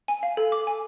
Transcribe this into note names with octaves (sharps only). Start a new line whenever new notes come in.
G#5
F5
A4
D6
G#5